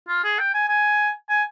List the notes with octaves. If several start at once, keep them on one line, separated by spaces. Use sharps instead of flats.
F4
G#4
G5
G#5
G#5
G#5